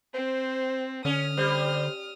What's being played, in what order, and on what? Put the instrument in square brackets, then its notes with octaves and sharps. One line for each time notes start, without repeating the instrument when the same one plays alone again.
[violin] C4 [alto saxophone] C5
[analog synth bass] D3 [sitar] C#4 [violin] D#6 F6
[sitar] G3 [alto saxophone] C5